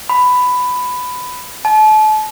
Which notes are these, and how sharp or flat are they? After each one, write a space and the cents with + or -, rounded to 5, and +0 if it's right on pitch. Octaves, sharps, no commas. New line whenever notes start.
B5 +10
A5 -35